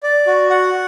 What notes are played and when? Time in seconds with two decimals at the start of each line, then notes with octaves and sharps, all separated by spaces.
0.03 D5
0.27 F#4
0.50 F#5